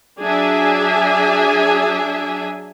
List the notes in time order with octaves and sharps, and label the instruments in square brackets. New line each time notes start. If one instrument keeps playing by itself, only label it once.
[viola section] F#3 D4 G#4 E5 G#5